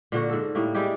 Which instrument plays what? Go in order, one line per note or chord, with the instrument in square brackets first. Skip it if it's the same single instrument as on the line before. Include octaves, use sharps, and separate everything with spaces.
[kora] A#2 D3 F#4
G#2 A4
A2 G3 A#3
G3 G#3 E4 G4